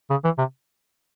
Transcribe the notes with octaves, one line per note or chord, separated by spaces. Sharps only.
C#3
E3
C3